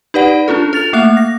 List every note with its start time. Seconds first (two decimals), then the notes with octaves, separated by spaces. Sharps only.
0.14 D#4 G4 B4 D5 F#5
0.48 C#4 D4 F4 A4
0.73 A4 A6 F7
0.93 A3 A#3 E5 F#6
1.17 A#6